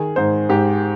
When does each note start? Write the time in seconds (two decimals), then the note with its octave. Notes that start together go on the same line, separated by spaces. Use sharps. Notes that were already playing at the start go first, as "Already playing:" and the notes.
Already playing: D#3 G#4
0.16 G#2 C5
0.49 G#2 G4